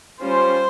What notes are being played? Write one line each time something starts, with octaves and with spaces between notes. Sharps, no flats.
G3 C#4 F4 C5